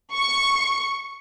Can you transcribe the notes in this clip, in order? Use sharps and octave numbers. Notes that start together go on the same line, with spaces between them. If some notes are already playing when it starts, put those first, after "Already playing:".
C#6